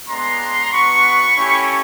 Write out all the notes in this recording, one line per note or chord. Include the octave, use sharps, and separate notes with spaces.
G#3 B3 D4 A#5 C6
B3 D4 F#4 B5 C#6
A3 C#4 E4 G4